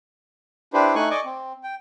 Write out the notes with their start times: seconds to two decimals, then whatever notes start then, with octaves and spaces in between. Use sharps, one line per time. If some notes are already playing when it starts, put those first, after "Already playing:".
0.73 D4 E4 G4 B4 C5
0.95 A3 D#4 G#5 C#6 F#6
1.10 D5 D#5 G#5 C#6 D6
1.25 C4
1.64 G5